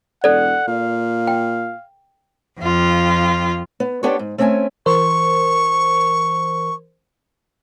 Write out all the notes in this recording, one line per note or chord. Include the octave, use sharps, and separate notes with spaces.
E1 A4 D5 F#5
A#2 F5
G5
F2 F4
B3
B3 D4 G4 A4 C5 C#5
G#2
A3 C4 C#4 D#5 E5 G#5
E3 A#4 C5 C#6